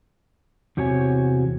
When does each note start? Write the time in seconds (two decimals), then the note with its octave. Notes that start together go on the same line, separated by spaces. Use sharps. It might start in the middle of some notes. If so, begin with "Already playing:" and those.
0.77 E2 C3 F#4 C#5 G#5